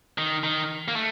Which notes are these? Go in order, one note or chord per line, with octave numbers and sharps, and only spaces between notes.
D#3
D#3
A#3
A3